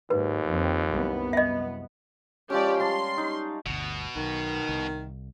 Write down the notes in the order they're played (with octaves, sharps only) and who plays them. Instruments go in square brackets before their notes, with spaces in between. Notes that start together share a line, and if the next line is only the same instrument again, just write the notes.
[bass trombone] D#2 [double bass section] G#2 [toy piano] B4
[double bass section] F2 C4
C2 F#2 B3
[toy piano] D#5 E5
[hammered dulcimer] F3 G#3 C#4 [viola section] G4 D5
[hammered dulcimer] G3 A5 A#5 [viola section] C6
[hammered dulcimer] D#4
[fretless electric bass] G1 D2 [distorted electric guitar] B2
[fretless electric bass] B1 [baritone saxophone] D#3
[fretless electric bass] C2